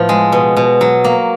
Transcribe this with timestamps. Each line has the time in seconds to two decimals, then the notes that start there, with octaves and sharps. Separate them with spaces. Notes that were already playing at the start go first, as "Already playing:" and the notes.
Already playing: A2 F3 B3
0.09 G#3
0.32 B2
0.57 B2
0.81 F#3
1.04 A#3